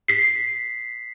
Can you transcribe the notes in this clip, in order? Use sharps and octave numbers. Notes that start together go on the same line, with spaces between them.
B6 C7